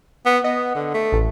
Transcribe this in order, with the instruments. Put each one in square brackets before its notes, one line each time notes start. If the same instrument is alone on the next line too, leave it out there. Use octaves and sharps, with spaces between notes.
[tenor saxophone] B3
[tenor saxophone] B3 [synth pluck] D#5
[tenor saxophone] D3
A3
[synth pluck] A1